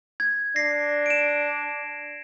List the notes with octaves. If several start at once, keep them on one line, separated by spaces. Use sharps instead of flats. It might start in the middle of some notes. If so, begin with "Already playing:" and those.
G#6
D4 A#6 C7
D7 E7